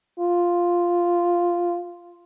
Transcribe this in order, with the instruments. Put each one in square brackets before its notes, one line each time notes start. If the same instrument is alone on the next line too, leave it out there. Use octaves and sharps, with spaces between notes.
[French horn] F4